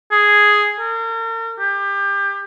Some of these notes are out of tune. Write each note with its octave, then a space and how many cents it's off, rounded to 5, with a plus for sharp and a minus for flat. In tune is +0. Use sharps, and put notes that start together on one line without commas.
G#4 +0
A#4 -40
G4 +25